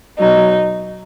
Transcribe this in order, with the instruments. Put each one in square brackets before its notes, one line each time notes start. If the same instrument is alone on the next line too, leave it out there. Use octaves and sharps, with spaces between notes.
[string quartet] B2 F#3 D#4